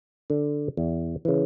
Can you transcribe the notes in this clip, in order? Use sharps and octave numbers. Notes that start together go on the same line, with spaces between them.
D3
E2
C#3 E3